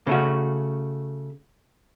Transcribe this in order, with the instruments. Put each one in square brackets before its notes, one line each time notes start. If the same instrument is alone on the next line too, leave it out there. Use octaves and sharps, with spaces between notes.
[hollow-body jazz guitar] C#3 A3 F#4